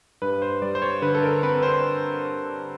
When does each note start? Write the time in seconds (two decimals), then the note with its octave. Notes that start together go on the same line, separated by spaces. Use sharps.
0.22 G2 B4
0.42 C5
0.62 G3 D5
0.75 C5
0.82 C#5
1.02 D3 B4
1.15 A4
1.23 A#4
1.43 C4 B4
1.63 C5